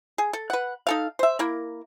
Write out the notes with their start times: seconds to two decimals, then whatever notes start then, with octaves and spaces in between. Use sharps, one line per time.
0.18 G#4
0.33 A4
0.50 B4 F#5
0.87 D#4 A4 F5
1.19 C5 E5
1.39 A#3 E4 A#4